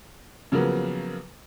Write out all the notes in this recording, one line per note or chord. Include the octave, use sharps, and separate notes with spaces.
C#3 F3 F#3 A#3 B3